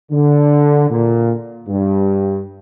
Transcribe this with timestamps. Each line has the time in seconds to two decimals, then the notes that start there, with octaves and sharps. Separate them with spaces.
0.11 D3
0.89 A#2
1.68 G2